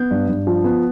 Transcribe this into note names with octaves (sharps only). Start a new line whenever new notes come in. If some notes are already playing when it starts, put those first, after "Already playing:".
Already playing: B3 G6
G2
G2
F3
B3